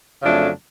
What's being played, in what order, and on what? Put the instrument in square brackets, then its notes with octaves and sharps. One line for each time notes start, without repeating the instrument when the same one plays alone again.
[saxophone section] F2 C#3 F#3 A3 D4